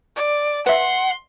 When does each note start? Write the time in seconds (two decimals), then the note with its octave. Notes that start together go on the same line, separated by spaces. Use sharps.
0.16 D5
0.67 B4 E5 F#5 C6